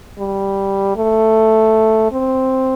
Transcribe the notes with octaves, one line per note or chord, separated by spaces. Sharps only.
G3
A3
C4